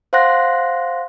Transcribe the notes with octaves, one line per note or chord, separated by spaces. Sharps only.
C5 F5 F#5 C6 F#6 A#6